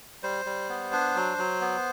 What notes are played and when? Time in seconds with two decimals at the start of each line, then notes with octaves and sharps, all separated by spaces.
0.23 G3 C5
0.45 G3
0.69 B3
0.92 D4
1.15 F#3
1.38 F#3
1.61 B3